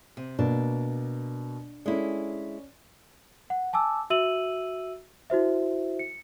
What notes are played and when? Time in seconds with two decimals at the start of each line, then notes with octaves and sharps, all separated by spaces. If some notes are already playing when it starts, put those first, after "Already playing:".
0.17 C3
0.39 B2 A#3 D4
1.86 G#3 C#4 E4 A4 D5
3.50 F#5
3.73 G#5 A5 D6 E6
4.10 F#4 E5 E6 D#7 F#7
5.30 E4 F#4 C5 E5
5.99 C#7